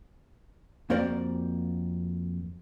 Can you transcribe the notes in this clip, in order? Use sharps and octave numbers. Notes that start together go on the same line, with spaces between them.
F2 A#3 F#4 A#4 C5 D5